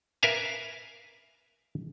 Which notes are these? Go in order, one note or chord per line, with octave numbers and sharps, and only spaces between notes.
A#4 B4 E5 F5 G#5